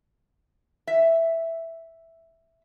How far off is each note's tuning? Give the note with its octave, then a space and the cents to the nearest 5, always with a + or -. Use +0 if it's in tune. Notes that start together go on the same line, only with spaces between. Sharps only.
E5 +0